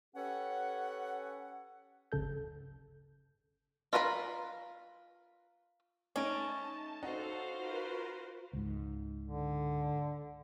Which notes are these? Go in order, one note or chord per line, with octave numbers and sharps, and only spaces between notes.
C#4 G4 A4 B4 C#5 F#5
G1 D2 C#3 A4 G6
F4 A#4 B4 G#5 B5
A3 C#4 D#4 A5 D7
D#4 F#4 A4 C5 F5 F#5
F4 A#4 B4
C#2 G#2
D3